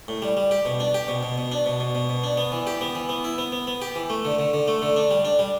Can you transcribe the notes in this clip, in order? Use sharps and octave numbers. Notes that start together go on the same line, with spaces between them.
A2
G3
G3
G4
B2
D4
G4
B2
B2
B2
D4
B2
B2
B2
B2
D4
B3
E3
G4
B3
E3
B3
E4
B3
B3
B3
G4
E3
A3
D3
D3
D3
A3
D3
D4
G3
D4
G3